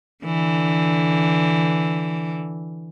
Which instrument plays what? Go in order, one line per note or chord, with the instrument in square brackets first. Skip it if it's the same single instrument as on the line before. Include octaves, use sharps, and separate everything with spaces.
[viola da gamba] D3 E3